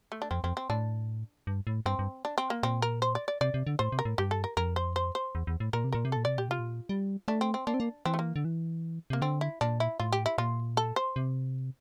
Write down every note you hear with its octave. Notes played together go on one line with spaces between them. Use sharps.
A3
D4
F2 C4
F2 C4
C4
A2 D4
G2
A2
G2 C4
G2
D4
C4
A#3
A#2 C4
A#4
C5
D5
D5
C3 D5
C3
D3
A2 C5
C3
A#4
A2
G2 G4
A4
A#4
F2 A#4
C5
C5
C5
E2
E2
A2
A#2 A#4
C3
A#2 A#4
C3
A#2 A4
C3 D5
A#2 G4
C3 F4
A#2
G3
A3 D4
C4
C4
A#3 D4
C4
A#3
E3 C4
A3
A#3
D3
E3
C3 A#3
D3 C4
E4
A#2 D4
E4
A2 F4
G4
E4
A#2 F4
A4
C5
C3